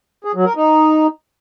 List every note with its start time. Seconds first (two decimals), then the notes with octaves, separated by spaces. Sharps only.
0.24 G#4
0.35 F#3
0.45 A#4
0.56 D#4